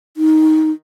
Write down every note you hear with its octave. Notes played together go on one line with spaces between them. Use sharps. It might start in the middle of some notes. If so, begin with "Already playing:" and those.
D#4